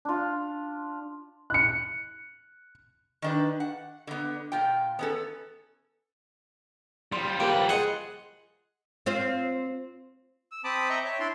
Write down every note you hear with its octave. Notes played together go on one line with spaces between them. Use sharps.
D4 F4
F#6 C#7
D#3 D4 B4
F#5
D3 B3
A#2 F4 G5
B3 C#4 A4
F3 G3 C6
A#3 G4 B4
G#4 D#5 F#5 C6
C4 F4 C5
E6
C4 A5 B5 D6 D#6
D#5 E5 G5 A#5 C#6
C#5 E5
D4 E4 D5 C6